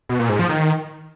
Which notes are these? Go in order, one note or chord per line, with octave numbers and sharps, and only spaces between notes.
B2
A#2
G#2
F3
D#3